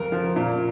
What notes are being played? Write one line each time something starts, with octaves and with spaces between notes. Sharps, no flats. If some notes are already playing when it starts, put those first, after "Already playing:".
Already playing: F2 A#4
F3
A#2